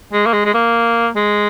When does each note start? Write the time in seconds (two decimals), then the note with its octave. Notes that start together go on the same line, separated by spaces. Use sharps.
0.13 G#3
0.26 A#3
0.33 G#3
0.45 G#3
0.54 A#3
1.16 G#3